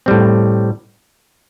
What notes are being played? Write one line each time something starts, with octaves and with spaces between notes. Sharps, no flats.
A2 G3 C4